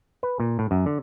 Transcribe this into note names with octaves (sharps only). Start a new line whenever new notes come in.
B4
A#2
A2
F#2
D3